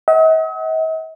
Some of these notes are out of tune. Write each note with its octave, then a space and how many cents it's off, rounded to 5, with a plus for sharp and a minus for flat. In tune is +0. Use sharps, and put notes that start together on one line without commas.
D#5 +45 F#5 +25